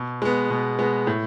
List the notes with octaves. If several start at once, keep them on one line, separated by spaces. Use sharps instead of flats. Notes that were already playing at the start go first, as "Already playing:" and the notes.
Already playing: B2
G#3 B3
B2
G#3 B3
A2